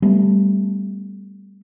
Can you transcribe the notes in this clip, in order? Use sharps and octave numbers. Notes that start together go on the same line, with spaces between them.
G3 A3 B3